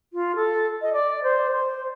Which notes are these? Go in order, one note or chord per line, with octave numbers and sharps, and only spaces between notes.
F4
A4
D#5
D5
C5
C5